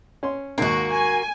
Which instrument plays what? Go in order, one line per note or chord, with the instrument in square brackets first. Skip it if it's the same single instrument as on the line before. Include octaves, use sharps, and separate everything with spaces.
[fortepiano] C#4 C6
[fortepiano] D#2 G#2 [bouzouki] A#3 F#4
[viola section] G#5